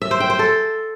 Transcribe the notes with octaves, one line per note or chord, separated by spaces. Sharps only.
E5
C5
G5
C5
A4